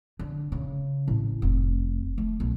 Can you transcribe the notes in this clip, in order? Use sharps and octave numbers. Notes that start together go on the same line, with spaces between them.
D3
C#3
A1
F1
A3
B1